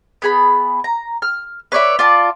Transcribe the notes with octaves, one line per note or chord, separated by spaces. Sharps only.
B3 G#4 B5
A#5
F6
B4 C#5 D5 E5
F4 D5 A5